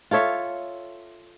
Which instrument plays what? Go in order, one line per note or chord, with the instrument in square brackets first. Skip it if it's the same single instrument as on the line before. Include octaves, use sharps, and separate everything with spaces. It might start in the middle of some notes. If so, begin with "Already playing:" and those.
[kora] F4 A4 C#5 E5